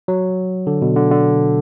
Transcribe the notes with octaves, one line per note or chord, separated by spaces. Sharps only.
F#3
D3
B2
D3
D3